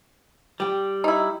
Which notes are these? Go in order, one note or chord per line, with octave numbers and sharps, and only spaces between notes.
G3 G4
D#4 E4